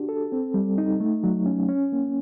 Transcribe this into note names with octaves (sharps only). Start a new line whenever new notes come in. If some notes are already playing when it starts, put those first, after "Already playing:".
Already playing: D4 F#4 G4
A4
C4
G3
D#4
A3
F#3
C#4
C#4
A#3